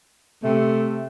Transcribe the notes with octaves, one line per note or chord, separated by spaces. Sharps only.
C3 A3